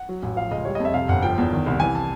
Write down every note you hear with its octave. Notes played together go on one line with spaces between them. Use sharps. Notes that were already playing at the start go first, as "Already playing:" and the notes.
Already playing: F#5
F#3
A1
F3 F5
C#2 D#5
G3 C#5
F2 D#5
E5
C3 F5
G1 F#5
F3 G5
E2
D#3
C2
E3 G#5
A5